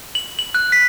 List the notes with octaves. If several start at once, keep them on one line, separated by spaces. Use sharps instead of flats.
F#7
F#7
F#6
B6